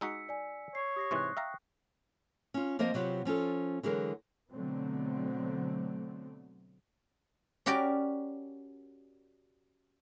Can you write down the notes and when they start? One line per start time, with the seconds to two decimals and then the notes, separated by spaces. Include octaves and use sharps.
0.01 G#3 D#4 F#4 E6 B6 C#7
0.29 D5 G#5
0.75 C#5 C7
0.96 G4 D#6 A#6 C7
1.11 G#2 C3 E3 C6 C#6 F#6
1.37 E5 F5 G5 A#5
2.54 C#4 F4
2.79 F3 A#3 C4 C5 D#5
2.94 C3 F#3 B3 F4 G4
3.25 F3 C#4 F4 A4
3.83 D3 E3 F#3 G#3 G#4 A#4
4.51 B2 D3 F#3 A3 B3 C4
7.66 C#4 F#4 G4 A#4 D5